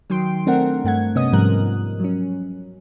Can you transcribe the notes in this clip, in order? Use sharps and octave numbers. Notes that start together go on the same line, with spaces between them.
D#3 F#3 G5 C6 D7
A3 C4 D4 A#4 F#5
G2 A3 F#5 G#6
C3 B3 C#4 D#5 D#6
G#2 F3 G3 A#4 F#6
F#3 C#4